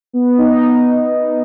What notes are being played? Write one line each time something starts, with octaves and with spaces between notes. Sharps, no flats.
B3
D#4